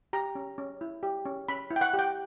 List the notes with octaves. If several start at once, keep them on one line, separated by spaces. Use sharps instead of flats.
G4 A#5
C#4
C#4
E4
G4
C#4
C#4 B5
E4
G5
F#5
G4
G5